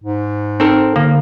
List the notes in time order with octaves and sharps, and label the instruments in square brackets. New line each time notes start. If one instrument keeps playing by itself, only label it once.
[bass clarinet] G#2
[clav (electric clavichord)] C4 A4 A#4 [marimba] D#4
[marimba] D3 [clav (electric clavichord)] A#3